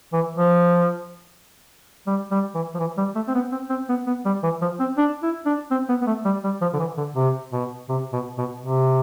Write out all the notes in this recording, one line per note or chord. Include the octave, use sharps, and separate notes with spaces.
E3
F3
G3
G3
E3
F3
E3
G3
A3
C4
B3
C4
C4
B3
B3
G3
E3
F3
C4
D4
E4
D4
C4
B3
B3
A3
G3
G3
F3
D3
E3
D3
C3
B2
C3
B2
B2
C3